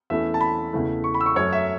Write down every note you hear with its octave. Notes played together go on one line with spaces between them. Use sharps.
E2 E3 A3 C#4 E4 E5
A5
B5
E2 C#3 E3 A3 E4
C#6
B5
E6
C#6
F#2 F#3 A3 C#5
E5